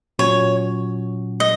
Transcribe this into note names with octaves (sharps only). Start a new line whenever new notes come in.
A#2 F#3 C#4 F#4 C#5
D#5